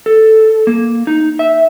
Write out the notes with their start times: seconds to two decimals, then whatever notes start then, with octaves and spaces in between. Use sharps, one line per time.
0.06 A4
0.67 A#3
1.07 D#4
1.39 E5